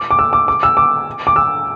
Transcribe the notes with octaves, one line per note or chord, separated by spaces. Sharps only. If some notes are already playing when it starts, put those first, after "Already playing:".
Already playing: D6
D6
E6
D6
D6
E6
D6
D6
E6